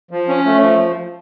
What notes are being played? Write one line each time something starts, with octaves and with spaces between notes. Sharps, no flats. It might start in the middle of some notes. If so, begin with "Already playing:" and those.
F3
C#4
A3
F3